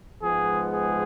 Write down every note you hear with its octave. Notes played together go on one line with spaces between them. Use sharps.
G#2 F3 G#3 B3 G#4
G#4